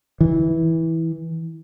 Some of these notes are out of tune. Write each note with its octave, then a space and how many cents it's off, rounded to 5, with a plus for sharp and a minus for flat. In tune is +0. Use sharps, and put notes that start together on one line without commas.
E3 -15